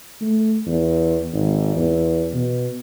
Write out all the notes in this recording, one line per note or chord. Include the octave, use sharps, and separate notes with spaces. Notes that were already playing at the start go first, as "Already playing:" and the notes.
A3
E2
G#1
E2
B2